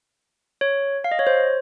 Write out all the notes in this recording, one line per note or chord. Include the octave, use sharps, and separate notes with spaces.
C#5
F5
D#5
C#5
C5